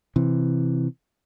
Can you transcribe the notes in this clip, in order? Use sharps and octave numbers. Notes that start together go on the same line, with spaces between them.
C3 E3